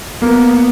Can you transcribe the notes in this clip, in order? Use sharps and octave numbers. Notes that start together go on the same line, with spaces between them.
A#3 B3